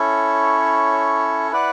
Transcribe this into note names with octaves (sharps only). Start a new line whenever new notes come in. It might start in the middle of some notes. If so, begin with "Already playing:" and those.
Already playing: C#4 E4 A4 C#5
E4 B4 D5 F#5